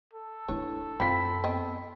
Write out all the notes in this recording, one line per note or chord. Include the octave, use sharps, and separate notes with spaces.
A4
D4 E4 B4 C#5
F#2 C4 F4 B5 B6
B3 C4 D#5